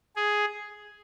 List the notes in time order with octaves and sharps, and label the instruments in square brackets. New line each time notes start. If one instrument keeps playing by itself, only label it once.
[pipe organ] G#4